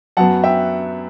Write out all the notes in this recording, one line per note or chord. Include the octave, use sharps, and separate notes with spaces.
F#2 F#3 B3 F#5 A5
E5 G5